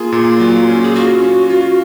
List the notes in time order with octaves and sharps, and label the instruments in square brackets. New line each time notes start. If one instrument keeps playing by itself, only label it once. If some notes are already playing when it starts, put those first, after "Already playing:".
Already playing: [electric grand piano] A#3 G#4 [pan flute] F4
[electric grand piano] A#2
F#3
C#4
[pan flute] G#4
[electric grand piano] F4 [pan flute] F#4
[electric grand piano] C#4
F4